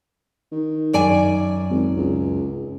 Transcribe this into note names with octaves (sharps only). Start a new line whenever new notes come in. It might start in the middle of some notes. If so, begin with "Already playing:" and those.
D#3
F#2 D5 G#5
G#1
C#2